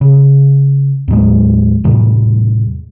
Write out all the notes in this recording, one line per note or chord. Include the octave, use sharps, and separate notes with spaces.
C#3
D#2 A2 F#3 G#3
E2 A2 C3 G3